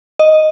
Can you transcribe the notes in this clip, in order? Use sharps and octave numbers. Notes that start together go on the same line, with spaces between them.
D#5